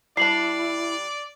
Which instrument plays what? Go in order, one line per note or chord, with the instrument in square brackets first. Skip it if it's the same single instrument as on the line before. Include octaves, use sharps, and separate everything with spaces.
[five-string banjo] G3 D4 [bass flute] E4 [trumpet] D5 [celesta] C7 F#7